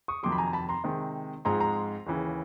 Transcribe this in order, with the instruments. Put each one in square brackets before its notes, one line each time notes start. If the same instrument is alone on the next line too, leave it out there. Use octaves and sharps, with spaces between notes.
[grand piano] C#6 D#6
F2 C3 D#3 F#3 C6 D6
B5
G#5 A#5
A5 B5
A#5 C6
C3 D#3 G#3 C4
G#2 F3 G#3 C4 A#5 C6
A#5 C6
D#2 C#3 E3